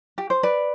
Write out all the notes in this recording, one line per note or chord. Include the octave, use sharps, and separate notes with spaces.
G4
C5
B4 D5